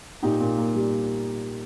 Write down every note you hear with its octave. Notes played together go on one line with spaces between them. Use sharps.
A#2 D#4 G4
A#2
A#3
G3